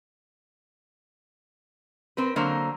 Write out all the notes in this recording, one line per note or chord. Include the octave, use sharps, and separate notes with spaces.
C4 A#4 B4
D3 F#3 A#3 A#4 C5